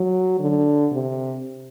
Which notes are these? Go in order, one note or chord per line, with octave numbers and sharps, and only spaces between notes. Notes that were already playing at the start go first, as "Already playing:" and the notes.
Already playing: F#3
D3
C3